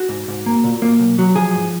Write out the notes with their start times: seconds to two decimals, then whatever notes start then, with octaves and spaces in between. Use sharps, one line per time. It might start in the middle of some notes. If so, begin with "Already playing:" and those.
Already playing: F#4
0.09 G#2
0.28 G#2
0.46 A#3
0.64 A#2
0.82 A#3
1.00 B1
1.19 F#3
1.36 F3 G#4
1.55 G#2